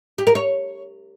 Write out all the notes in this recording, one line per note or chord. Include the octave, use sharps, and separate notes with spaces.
G4
A#4
C#5